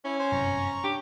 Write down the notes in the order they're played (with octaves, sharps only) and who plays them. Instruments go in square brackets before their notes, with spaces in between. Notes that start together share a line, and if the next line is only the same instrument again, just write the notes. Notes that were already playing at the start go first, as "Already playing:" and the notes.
[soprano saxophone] C#4 [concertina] E4
[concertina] C5 G#5
[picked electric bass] G1 F#2 C3 [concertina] A#5 C#6
[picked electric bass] D4 [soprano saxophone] G4